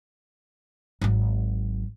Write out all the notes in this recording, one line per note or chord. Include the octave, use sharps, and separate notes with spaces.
G#1 F#3